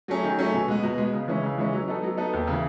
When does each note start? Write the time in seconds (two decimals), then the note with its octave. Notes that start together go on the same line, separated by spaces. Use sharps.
0.08 F#3 A3 C#4 G#4
0.23 D#3
0.38 F#3 A3 C#4 G#4
0.53 B2
0.68 G#3 B3
0.83 B2
0.98 G#3 B3
1.13 C#3
1.28 E3 G#3 C#4 E4
1.43 C#3
1.58 E3 G#3 C#4 E4
1.73 F#3
1.88 B3 D#4 A4
2.03 F#3
2.17 B3 D#4 A4
2.33 D#2
2.47 C#3 E3